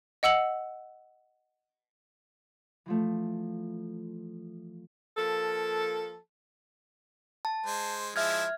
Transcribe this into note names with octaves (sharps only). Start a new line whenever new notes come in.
D#5 F#5 E6 C#7 F#7
E3 F3 A3
F3 A#3 A4
A5
G#3 C5
F3 G#3 E4 E5 F6 G#6